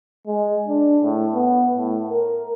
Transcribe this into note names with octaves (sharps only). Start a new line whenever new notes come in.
G#3
D4
A2
B3
A2
A#4